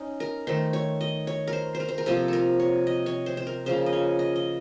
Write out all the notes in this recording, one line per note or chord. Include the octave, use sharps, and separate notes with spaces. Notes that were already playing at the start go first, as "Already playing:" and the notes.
Already playing: C#4 D#4
A#4
D#3 A3 C5
C#5
D#5
C#5
A#4
C5
C5
A#4
C5
A#4
C3 F3 A#3 A4
A4 A#4
C#5
D#5
C#5
C5
C5
A#4
C#3 F3 A#3 C5
D#5
C#5
D#5
D#5